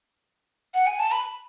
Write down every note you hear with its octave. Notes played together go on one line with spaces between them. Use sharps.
F#5
G#5
A5
B5